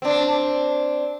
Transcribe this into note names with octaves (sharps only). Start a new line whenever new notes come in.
C4 D4